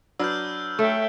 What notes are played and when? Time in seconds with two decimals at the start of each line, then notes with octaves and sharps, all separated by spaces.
0.19 F#3 D4 B4 E6 F6 G6
0.79 A3 C#5 E5 G5